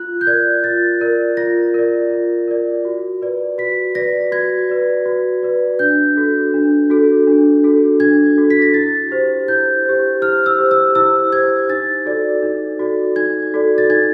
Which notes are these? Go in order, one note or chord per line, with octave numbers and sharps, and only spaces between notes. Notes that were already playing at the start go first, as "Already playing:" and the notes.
Already playing: F4 F#6
G6
A#4 D5 G#6
F4 A6
A#4 D5
F4 A#6
A#4 D5
F4
A#4 D5
F#4
B4 D5
F#4 B6
B4 D5 A#6
F#4 G#6
B4 D5
F#4
B4 D5
D4 G6
F#4 A4
D4
F#4 A4
D4
F#4 A4
D4 G#6
F#4 A4
B6
A#6
E4 A6
G4 C5
E4 G6
G4 C5
E4 F6
E6
G4 C5
E6
E4 E6
G4 C5 G#6
D#4 A6
F#4 A4 D5
D#4
F#4 A4 D5
D#4 G#6
F#4 A4 D5
A6
D#4 G#6